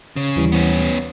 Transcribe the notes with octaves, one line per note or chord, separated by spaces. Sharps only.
C#3
D#2 E3 G3
B3 C#4